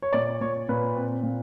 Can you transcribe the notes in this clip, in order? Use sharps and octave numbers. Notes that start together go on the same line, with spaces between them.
C#5
A#2 D5
A#2 C#5
A#2 B4
C4
A#2